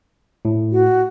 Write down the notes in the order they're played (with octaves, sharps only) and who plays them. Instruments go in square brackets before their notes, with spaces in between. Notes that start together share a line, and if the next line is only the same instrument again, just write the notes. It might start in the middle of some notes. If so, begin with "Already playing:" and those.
[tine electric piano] A2
[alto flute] F#4